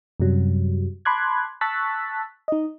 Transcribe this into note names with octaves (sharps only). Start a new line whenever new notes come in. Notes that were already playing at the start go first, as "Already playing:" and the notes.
F#2 C3 F#3 G3
A5 B5 C6 D6 F#6 G#6
A5 C#6 E6 F#6 A6 B6
D#4 D#5